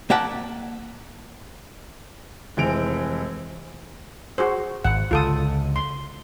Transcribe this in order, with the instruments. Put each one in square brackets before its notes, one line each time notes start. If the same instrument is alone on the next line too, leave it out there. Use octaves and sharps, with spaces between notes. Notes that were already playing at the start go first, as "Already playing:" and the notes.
[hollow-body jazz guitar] A#3 E5 F#5 G5 A5
[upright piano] F1 E3 G#3 C4 D7 F7
[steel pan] F#4 G#4 C5
[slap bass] G#1 [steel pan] F#5
[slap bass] C#2 D3 [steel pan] F4 A4 D#6
[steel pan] C6